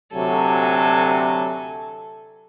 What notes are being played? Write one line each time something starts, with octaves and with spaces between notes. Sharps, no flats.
D2 C3 F#3 A4 G#5